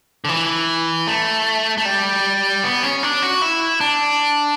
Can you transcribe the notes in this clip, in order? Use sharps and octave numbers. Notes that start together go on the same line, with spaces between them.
D3
E3
A3
A3
G3
B3
C#4
D4
F#4
E4
D4